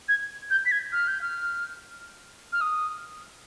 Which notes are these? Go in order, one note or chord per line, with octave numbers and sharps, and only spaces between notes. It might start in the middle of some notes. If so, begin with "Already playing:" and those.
G#6
G6
B6
G#6
F6
G6
F6
F6
D#6